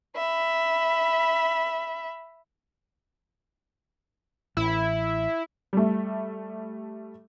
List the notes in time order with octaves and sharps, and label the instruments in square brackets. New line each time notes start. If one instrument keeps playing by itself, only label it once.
[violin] E5 B5
[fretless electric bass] A1 [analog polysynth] E4
[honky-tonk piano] G3 A3